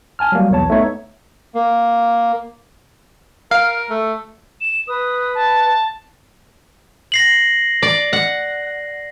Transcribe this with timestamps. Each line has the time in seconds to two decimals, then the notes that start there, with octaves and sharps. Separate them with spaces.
0.19 G#5 A5 F6
0.32 F#3 G3 A#3
0.50 B1 E2 C#5 A5
0.70 A3 B3 D#4 C#5 E5
1.55 A#3
3.51 A#4 F5
3.90 A3
4.61 E7
4.88 B4 D#6
5.35 A5
7.12 A#6 C7 F#7
7.82 D5
8.13 F#5